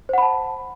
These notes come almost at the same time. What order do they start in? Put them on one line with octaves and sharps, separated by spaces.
C5 F#5 B5 A5